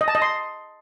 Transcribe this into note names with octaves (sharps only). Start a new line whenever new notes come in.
D#5
A5
D#5
C6